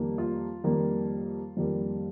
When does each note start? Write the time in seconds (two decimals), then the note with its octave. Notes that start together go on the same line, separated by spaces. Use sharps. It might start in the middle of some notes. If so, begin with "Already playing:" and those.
Already playing: F2 D#3 G3 A#3
0.18 F4
0.64 F2 D#3 G3 A#3
1.57 F2 D#3 G3 A#3